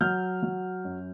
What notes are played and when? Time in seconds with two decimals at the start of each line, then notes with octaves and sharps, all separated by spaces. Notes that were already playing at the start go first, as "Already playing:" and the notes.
0.01 F#3 F6 G6
0.43 F#3
0.85 F#2